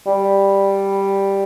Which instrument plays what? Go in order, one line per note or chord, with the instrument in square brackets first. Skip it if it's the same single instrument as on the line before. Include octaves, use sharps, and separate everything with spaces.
[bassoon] G3